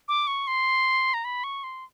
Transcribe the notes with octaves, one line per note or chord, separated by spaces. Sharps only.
D6
C#6
C6
A#5
B5
C#6
C6